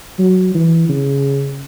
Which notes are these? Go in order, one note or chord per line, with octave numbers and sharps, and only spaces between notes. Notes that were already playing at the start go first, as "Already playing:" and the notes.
F#3
E3
C#3